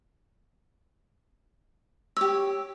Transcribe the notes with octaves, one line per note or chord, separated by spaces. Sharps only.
G4 C#5 E6